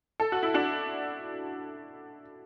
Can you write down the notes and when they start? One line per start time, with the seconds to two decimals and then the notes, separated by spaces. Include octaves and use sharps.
0.20 A4
0.32 F#4
0.43 E4
0.54 D4 F#4